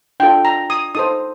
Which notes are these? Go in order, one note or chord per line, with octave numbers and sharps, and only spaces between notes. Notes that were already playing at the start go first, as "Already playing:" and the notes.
D4 F4 A4 G5
A#5
D#6
D#4 A4 C5 D#6